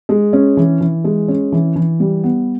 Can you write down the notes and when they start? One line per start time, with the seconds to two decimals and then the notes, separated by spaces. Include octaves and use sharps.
0.09 G#3
0.33 C#4
0.57 E3
0.81 E3
1.04 G#3
1.28 C#4
1.52 E3
1.76 E3
2.00 G3
2.24 B3